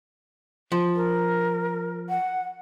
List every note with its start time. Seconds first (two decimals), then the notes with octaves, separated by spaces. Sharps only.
0.72 F3
0.95 A#4
2.09 F#5